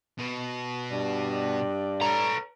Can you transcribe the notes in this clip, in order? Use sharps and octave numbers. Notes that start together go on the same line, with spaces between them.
B2
G2 D5
A4 B4 C#5 A#5